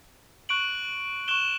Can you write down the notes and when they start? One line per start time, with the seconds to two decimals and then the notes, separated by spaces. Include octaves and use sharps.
0.49 C#6 F#6 D7 F#7
1.28 C#6 F#6 E7 G7